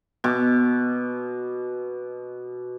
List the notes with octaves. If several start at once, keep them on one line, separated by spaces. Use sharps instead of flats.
B2 D6